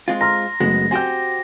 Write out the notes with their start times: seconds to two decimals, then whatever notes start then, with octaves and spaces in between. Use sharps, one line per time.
0.08 G#3 C4 F4
0.21 A#5 C6 F6 A#6
0.60 F#1 G#3 A3 B3 F#4
0.91 C4 F#4 G4 G#5 G6